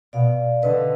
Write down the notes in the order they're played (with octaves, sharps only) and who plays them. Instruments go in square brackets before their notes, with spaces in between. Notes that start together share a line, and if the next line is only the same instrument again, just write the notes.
[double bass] B2 [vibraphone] D5 F5
[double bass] D3 [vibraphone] B4 D#5